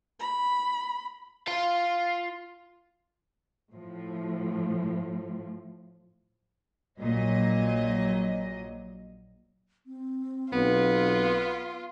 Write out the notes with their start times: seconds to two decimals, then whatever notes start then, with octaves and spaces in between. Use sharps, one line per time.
0.20 B5
1.48 F4 F5
3.72 A2 F3
7.00 A#1 A#2 F#3 D#5
9.86 C4
10.52 B1 B3 F4